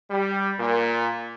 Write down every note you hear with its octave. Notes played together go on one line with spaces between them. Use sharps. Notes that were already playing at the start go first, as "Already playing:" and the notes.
G3
A#2